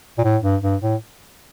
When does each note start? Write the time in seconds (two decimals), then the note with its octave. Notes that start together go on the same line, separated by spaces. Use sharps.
0.18 A#2
0.24 A2
0.43 G2
0.62 G2
0.82 A2